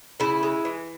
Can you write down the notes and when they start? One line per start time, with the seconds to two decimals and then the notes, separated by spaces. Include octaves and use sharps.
0.20 C#3 E4
0.43 G#3
0.65 E3